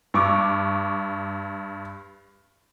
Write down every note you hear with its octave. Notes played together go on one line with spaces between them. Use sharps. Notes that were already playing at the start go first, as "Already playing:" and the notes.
G2 C#6 D6